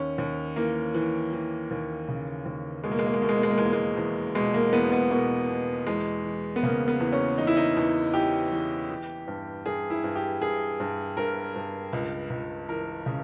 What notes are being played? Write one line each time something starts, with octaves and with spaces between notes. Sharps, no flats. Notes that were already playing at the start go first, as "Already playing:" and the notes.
Already playing: D#2 C#4
D#2
E3 A#3
E3
E3
D#2
C#3
D#2
B2 G#3
A#3
G#3
A#3
G#3
B2 A#3
G#3
A#3
G#3
A#3
E2 G#3
A#3
G#3
E2
B2 G#3
A#3
E2 B3
B3
B2 A#3
B2
E2 G#3
E3
B3
C#3 A#3
B3
E2
C#4
E3 D#4
E4
D#4
E2
E3 G4
E3
E3
G2
G2 G#4
E4
G2
G4
G2 G#4
G2
G2 A#4
G2
C#2
C#2
E3 A#4
C#3